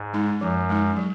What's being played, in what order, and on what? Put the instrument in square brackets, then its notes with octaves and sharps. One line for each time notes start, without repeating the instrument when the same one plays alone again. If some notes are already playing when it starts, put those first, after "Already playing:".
Already playing: [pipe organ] G#2
[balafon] G#3 D#4
[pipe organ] F#2 [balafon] F3
[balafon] G#3 D#4
F#3